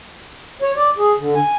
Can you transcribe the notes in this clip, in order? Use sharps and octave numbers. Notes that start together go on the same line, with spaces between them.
C#5
D5
G#4
D3
G#5